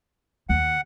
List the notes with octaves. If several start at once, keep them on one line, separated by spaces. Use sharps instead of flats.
D#2 F#5